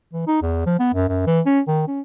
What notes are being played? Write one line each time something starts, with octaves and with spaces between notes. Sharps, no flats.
E3
D#4
E2
F3
B3
F#2
F#2
E3
C#4
D#3
C#4